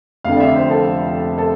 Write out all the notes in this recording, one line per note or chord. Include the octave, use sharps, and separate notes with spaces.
F1 F2 D3 F5
D5
E5
C5
A4
A4